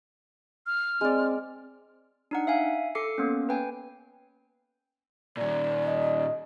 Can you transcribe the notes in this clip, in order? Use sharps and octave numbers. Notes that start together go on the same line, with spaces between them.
F6
G#3 C4 D5
D4 D#4 F#5
E5 F5 G#5
A4 D6 C7 C#7
A#3 B3 C#4
B4 G5 G#5
A#2 D#3 D5
D#5